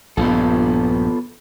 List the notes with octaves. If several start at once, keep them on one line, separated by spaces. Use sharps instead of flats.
A#1 G2 B3 F4 A4